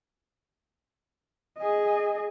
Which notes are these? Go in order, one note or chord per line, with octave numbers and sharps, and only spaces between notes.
G#4 D#5